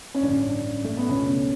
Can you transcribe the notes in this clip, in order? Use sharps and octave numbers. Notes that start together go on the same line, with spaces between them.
C#4
A1 G2 D3 D4
A3
B3
C#2 B2 C#4